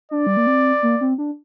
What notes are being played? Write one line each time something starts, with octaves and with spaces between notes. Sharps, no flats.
D4 D5
G3
A#3
C4
A#3
C4
D4